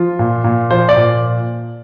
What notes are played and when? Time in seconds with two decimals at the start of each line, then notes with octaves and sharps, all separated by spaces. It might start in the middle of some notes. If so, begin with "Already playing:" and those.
Already playing: F3 F4
0.19 A#2
0.44 A#2
0.71 F3 C5
0.89 D5
0.97 A#2